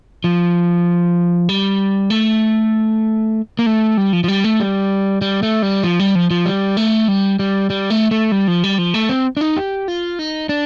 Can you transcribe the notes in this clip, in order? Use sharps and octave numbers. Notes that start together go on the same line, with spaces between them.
F3
G3
A3
A#3
A3
G3
F3
F3
G3
A3
G3
G3
A3
G3
F3
G3
F3
F3
G3
A3
G3
G3
G3
A3
A3
G3
F3
G3
F3
A3
C4
D4
D#4
G4
F4
D#4
D4